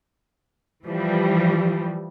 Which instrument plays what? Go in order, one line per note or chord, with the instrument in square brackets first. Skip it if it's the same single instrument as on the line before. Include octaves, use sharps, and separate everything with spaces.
[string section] E3 F3 G3